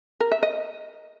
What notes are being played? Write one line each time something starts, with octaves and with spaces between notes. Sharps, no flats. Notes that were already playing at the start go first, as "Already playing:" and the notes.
A#4
E5
D#5